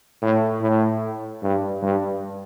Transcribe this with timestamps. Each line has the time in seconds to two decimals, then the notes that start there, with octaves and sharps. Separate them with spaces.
0.22 A2
0.61 A2
1.43 G2
1.83 G2